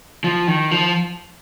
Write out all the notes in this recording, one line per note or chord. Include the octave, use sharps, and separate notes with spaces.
F3
D#3
F3